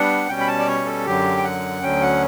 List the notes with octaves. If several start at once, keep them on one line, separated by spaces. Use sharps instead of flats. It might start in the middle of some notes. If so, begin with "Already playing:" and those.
Already playing: G3 B3 D4 F#5
B2 G3 C#4 G5
B5
A5
D5
C#5
A4
F#2 D3 F#3 G4
G5
F#5
D2 D3 F#3 C#4 G5
F#5